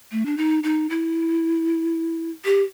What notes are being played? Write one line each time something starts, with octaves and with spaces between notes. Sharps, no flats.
A3
D4
D#4
D#4
E4
G4